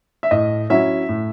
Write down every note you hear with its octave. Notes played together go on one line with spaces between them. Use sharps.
E5
A2 D#5
F#3 C#4 E4 E5
A2